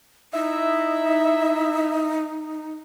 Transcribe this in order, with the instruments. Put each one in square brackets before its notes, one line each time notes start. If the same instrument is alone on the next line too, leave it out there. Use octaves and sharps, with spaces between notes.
[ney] D#4 [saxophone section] E4 D#5 E5